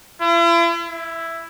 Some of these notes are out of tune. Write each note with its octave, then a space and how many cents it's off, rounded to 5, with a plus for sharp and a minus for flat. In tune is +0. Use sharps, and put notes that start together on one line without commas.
E4 +45
E4 +5